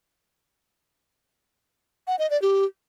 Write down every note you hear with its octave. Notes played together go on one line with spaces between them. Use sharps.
F#5
D#5
D5
G4